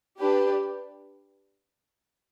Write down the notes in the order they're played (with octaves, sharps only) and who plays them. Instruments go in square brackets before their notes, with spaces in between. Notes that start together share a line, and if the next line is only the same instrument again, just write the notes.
[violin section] D4 G4 B4